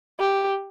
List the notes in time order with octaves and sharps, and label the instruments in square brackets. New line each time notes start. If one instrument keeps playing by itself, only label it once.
[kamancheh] G4